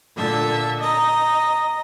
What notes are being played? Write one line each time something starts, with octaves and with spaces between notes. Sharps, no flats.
A#2 D3 E5 A5
D#5 A#5